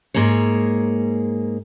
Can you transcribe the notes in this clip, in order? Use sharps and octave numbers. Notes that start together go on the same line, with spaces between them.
G#2 A#3 G#4 C#5